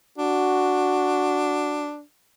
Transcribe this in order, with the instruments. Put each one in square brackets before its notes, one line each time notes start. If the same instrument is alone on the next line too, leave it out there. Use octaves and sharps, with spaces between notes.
[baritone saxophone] D4 [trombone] F#4